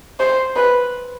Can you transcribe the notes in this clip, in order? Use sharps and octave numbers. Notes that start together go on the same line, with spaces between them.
C5
B4